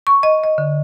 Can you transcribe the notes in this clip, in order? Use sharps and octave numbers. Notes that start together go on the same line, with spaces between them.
C#6
D#5
D#5
D3